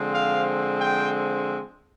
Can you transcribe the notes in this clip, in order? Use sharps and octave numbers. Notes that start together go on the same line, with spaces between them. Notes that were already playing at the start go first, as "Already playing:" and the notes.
Already playing: D3 F3 G#3 C4
F5
G5